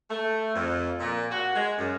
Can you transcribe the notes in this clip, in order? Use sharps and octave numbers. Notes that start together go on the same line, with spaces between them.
A3
F2
A#2
F#4
G#3
F#2